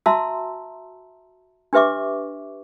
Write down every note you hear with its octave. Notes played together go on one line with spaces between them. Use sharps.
F#4 E5 A5 A#5 C6 E6
D4 G4 B4 E5 C#6 D6